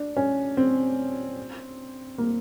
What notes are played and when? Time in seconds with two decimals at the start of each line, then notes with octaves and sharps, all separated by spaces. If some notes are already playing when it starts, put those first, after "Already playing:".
Already playing: D4
0.17 C#4
0.57 C4
2.18 A#3